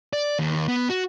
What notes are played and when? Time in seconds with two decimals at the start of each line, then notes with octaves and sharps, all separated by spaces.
0.13 D5
0.39 D#2
0.68 B3
0.90 F#4